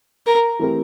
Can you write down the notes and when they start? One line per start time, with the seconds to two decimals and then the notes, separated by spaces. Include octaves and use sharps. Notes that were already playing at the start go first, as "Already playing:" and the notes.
0.27 A#4
0.59 E3 A3 C4 G4 A#4